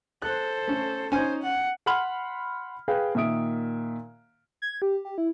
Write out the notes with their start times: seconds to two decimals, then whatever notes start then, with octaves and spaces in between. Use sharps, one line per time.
0.22 A4 C5 F#6
0.67 A3 C#4
1.12 C#4 D#4 C5 G#5
1.43 F#5
1.86 F#5 B5 C6 F6 F#7
2.88 G#4 B4 F5 G5
3.15 A#2 D#3 E5 D#6 D7
4.62 G#6
4.82 G4
5.05 G4
5.18 E4